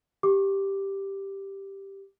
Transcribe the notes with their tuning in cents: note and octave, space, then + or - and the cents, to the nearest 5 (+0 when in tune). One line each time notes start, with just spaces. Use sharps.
G4 +0 D6 +0